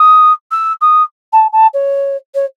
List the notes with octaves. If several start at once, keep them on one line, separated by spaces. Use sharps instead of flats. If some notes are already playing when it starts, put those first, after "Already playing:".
Already playing: D#6
E6
D#6
A5
A5
C#5
C#5